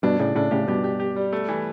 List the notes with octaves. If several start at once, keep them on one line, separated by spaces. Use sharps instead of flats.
G2 B2 D4
A2 C#3 D4
A2 C#3 D4
A2 C#3 G4
G2 B2 G4
G4
G4
G3
A3
E3